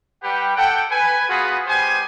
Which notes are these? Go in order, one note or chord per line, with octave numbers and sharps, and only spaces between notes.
G3 G4 B4 F#5 G5
A4 F#5 G5
B4 G#5
B3 F4 F#4 G#4 B4
G3 B3 G4 C5 G#5